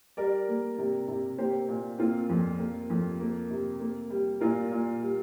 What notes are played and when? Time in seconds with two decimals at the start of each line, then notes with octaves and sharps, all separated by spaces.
0.17 G3 A#4 D5
0.48 A#3
0.78 C3
1.08 C3
1.38 A#3 G4 C5
1.68 A#2
1.99 A#3 C4 F4
2.30 F2
2.59 A#3
2.90 F2
3.20 A#3
3.50 C3
3.80 A#3
4.10 G3
4.41 A#2 F4 A#4
4.71 A#2
5.01 G3